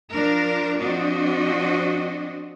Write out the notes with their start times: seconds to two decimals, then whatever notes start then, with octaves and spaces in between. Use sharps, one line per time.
0.11 F3 D4 A#4
0.80 F3 C4 D4 F#4 D#5